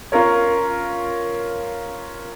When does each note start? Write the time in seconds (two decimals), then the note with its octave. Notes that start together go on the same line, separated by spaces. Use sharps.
0.12 C#4 F4 A#4 C#5